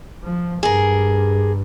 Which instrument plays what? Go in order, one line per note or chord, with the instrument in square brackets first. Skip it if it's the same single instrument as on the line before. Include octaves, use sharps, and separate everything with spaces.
[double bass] F3
[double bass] G2 [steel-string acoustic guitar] G#4 A#4